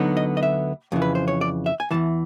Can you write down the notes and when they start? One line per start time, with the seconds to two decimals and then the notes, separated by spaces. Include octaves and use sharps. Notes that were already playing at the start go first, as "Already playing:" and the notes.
Already playing: D2 D3 F#3 B3 D#4
0.17 D#5
0.37 D#5
0.43 E5
0.92 F2 C#3 E3
1.02 B4
1.15 C5
1.28 C#5
1.41 D5
1.66 E5
1.80 G#5
1.91 E2 C3 E3 A5